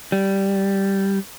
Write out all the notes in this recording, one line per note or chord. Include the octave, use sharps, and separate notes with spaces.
G3